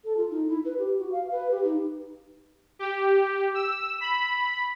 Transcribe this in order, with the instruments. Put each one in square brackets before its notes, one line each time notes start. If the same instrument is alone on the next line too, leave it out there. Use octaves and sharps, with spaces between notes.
[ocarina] A4
F4
D#4
E4
B4
G4
F#4
F5
B4
G4
D#4
[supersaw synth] G4
E6
B5